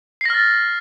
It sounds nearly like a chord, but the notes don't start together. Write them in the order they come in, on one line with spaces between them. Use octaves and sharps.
C7 A#6 F6 A6